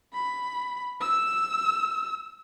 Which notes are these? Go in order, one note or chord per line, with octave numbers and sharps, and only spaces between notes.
B5
E6